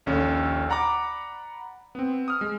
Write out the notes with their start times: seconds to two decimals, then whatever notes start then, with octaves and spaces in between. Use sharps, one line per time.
0.06 A#1 D#2 C#4 A4
0.69 D5 F#5 A#5 B5 D6
1.95 B3 C4
2.28 D#6 F6
2.41 G#3